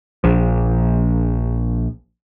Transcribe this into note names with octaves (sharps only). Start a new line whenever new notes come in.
A#1 F3